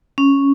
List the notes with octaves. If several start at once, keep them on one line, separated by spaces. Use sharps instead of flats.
C#4